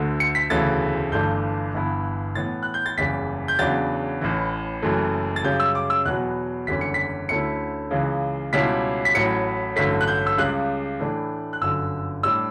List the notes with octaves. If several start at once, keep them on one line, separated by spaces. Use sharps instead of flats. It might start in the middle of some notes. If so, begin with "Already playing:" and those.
Already playing: D2 D3 A3
C#7
B6
E1 D2 C#3 E3 A3 A6
G1 G2 E3 A3 D4 G6
G1 G2 E3 B3 E4
A2 E3 B3 A6
F#6
G6
A6
F#1 E2 C#3 G3 B6
G6
E2 C#3 F#3 B3 D4 A6
A1 A2 E3
F#1 F#2 E3 A3
A6
F#2 C#3 G3 C#4 G6
E6
D6
E6
E2 B2 F#3 B3 F#6
F#1 E2 D3 G3 C#4 B6
C#7
B6
D2 D3 A3 C#4 E4 C#7
C#2 C#3 E3
C#2 B2 G3 C#4 E4 B6
B6
A1 A2 F#3 C#7
A1 G2 D3 F#3 A3 B6
F#6
G6
E6
C#2 C#3 G3 F#6
A2 E3 A3 D4
F#6
G1 F#2 D3 E6
A2 G3 D4 E6